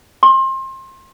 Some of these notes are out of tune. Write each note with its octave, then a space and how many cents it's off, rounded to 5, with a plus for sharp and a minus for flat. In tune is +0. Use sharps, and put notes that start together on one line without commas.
C6 +30